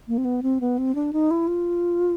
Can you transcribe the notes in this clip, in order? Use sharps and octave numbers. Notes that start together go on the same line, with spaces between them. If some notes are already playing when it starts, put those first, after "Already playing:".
A#3
C4
B3
C4
B3
C4
D4
D#4
E4
F4